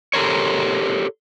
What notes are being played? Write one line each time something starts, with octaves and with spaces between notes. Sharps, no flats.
G4 A4 A#4 C5 C#5